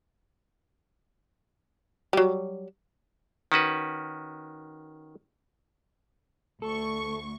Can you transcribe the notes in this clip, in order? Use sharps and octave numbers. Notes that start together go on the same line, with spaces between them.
F#3 G3
D#3 C#4 F#4 B4
D2 A4 C#6